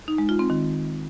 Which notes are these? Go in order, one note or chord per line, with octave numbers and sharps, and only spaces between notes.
D#4
G#3
F4
C4
D#3